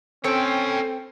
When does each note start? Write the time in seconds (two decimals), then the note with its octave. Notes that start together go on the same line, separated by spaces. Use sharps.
0.24 C4 C#4 A4 C#5 G5